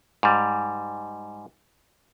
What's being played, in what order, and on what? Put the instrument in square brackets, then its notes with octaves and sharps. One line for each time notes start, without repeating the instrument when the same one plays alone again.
[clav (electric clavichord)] G#2 G3